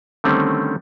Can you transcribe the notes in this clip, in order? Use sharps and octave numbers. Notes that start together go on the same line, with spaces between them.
D3 D#3 G3 A3 C4 C#4